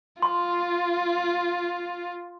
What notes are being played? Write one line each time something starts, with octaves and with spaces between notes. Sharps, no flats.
F4 C6